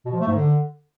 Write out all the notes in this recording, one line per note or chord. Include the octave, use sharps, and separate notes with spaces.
B2
F3
A3
G#2
D3